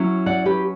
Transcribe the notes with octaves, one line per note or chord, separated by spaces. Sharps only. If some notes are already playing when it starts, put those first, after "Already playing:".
Already playing: F#3 C#4 E4
D5 F#5
G4 B4